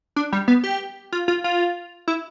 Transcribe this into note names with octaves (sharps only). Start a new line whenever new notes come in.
D4
G3
B3
G4
F4
F4
F4
E4